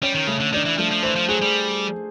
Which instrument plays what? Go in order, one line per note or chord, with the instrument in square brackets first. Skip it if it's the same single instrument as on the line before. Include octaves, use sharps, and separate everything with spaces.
[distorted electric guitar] G3 [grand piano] C#4
[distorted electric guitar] D#3
[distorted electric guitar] C#3 [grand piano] A3
[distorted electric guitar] D3
[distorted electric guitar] D#3 [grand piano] D4
[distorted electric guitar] E3
[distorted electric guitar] F3 [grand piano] A3
[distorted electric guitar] F3
[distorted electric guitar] E3 [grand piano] C5
[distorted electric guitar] F3
[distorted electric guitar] F#3 [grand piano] G#4
[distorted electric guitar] G3